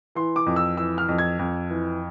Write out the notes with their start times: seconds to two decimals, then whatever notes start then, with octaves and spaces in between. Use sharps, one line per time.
0.15 E3 C6
0.36 D6
0.46 F2
0.56 E6
0.77 E3 E6
0.98 F6
1.08 F2
1.18 G#6
1.39 F2
1.70 E3